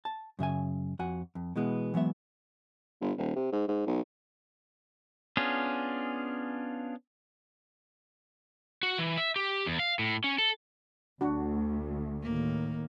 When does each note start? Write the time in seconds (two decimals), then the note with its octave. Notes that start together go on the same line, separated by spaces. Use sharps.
0.05 A5
0.39 F#2 C#3 E5 G#5
0.99 F2 F#4 F#5 G#5
1.35 F2
1.56 B2 E3 G#3 B3
1.94 E3 F#3 G#3 B3 E5
3.01 G1
3.18 D#1
3.36 C3
3.52 G#2
3.68 G#2
3.87 B1
5.37 B3 C#4 D4 F4 G#4
8.83 F#4
8.98 E3
9.18 E5
9.36 G4
9.66 E2
9.79 F5
9.99 A2
10.24 C#4
10.38 A4
11.21 D2 D4 F#4
12.23 A2 D#3 A#3